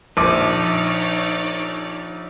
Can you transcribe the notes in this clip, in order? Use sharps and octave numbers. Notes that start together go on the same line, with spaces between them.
A#1 D#4 C#5 D5 D6